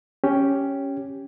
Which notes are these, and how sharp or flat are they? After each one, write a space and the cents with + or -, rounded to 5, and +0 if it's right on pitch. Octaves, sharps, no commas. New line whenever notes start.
C#4 +0 G4 +0